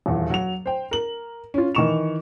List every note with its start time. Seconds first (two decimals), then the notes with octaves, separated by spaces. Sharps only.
0.06 D#1 E2
0.30 F#3 F7
0.66 C5 G5
0.91 A#4 F#7
1.54 C#4 F4
1.75 D#3 E3 D#4 C#6 E7 F7